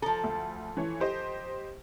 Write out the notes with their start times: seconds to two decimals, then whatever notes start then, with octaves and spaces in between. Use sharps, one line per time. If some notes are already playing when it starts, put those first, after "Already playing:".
0.02 F3 A4 A#5
0.24 D2
0.77 E3 C#5
1.00 G4 C5 D#5